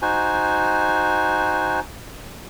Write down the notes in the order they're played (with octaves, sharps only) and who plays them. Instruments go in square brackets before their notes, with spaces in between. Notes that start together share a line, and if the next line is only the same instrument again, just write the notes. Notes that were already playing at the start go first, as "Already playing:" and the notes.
[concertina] D#4 F#4 C5 G#5